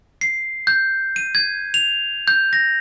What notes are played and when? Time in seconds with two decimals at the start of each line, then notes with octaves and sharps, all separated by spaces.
0.21 C7
0.67 G6
1.16 D#7
1.35 G#6
1.74 F7
2.28 G6
2.53 A#6